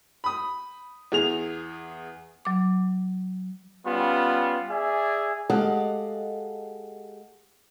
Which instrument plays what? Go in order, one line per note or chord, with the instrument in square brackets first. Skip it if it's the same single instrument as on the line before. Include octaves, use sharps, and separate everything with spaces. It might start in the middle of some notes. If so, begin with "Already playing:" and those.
[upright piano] B5 D#6
E2 G#4 F7
[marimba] F#3 D6
[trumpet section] G3 B3 C#4 F4
G#4 D5 E5 G#5
[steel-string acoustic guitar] G#3 G4 A4 D#5 F5 F#5